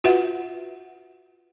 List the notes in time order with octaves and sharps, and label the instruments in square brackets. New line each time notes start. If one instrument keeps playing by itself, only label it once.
[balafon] F4 F#4 B4 E5 F#5